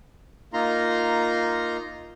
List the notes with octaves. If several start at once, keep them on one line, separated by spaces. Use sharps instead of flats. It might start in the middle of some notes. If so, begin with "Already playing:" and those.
A#3 D#4 F4 A#5 C6